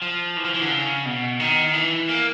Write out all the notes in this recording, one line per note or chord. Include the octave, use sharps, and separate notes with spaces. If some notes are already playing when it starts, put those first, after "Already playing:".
F3
E3
F3
E3
D3
C#3
B2
D#3
E3
A#3